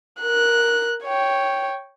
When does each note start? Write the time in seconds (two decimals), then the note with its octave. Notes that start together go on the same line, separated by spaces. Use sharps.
0.21 A#4 F#6
1.04 C#5 G5